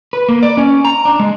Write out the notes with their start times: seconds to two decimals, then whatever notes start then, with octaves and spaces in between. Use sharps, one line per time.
0.13 B4
0.29 A#3
0.43 D5
0.57 C#4
0.85 A#5
1.05 D4
1.20 G#3